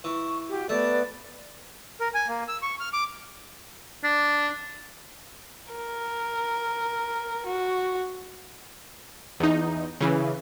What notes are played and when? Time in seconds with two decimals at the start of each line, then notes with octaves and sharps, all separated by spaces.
0.04 E3 C#6
0.49 F#4 G4
0.69 A3 B3 D5
1.99 A#4
2.14 G#5
2.28 A#3
2.48 E6
2.62 C#6
2.80 F6
2.93 D6
4.04 D4
5.72 A#4
7.46 F#4
9.40 E2 D#4
10.01 C#3 E3